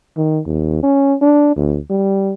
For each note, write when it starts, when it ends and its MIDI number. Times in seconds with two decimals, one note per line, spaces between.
0.17 0.40 51
0.46 0.79 39
0.83 1.15 61
1.21 1.53 62
1.56 1.78 38
1.90 2.34 55